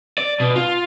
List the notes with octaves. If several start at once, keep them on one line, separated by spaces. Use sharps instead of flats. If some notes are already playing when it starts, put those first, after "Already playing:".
D5
B2
F4